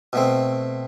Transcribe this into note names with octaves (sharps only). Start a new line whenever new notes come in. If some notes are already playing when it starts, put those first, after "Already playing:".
B2 A3 C4